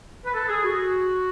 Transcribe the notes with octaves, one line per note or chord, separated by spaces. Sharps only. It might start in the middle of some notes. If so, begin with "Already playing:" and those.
B4
A4
G#4
F#4